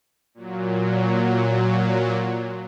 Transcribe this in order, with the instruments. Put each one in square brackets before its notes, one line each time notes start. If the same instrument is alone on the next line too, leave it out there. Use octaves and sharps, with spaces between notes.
[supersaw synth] A#2 F#3